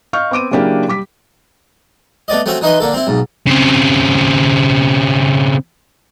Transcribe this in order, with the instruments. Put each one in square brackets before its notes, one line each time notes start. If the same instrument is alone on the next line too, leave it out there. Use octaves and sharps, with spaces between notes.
[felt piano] D#5 F5 C#6 F6 G6
B3 C4 D6 D7 D#7
C#3 F#3 A#3 D4 E4 G4
G3 D6 B6
[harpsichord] A3 B3 D5 D#5
A3 C4 C#4 F#4 E5
E3 D#4 B4 D#5 C6
D3 A#3 A4
C4 E4
B1 G#2
[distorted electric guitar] C#3 C4